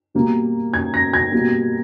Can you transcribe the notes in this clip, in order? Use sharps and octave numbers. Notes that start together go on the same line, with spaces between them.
B2 G3 A#3
G#6
A#6
G#6
B2 G3 A#3